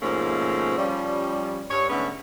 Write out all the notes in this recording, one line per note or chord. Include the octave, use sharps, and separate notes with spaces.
G#2 B2 F3 A3 A#3 C#4
F3 G3 C#4
G2 C#5
G#2 D3 A3 B3 C#4